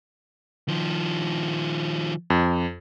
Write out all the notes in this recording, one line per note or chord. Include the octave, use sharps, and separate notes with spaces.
D#3 F3
F2